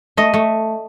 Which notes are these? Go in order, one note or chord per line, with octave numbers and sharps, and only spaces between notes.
A3 D#5
A3